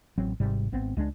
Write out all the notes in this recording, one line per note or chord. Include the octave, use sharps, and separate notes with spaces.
A1 F#3 C4
G#1 G#2 C3 G3
G#1 B3 C4
C#2 G#3 C#4 D4